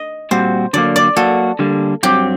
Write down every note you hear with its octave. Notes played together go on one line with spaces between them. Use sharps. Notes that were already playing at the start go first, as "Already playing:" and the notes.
Already playing: D#5
A#2 G3 C4 F#4 C5
D3 F#3 A#3 D5
D5
F#3 A#3 F#4 A4
D3 G3 A#3
G2 F#3 C4 G4